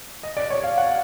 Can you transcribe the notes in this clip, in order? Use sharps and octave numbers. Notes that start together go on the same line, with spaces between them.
D#5
D5
C#5
F5
F#5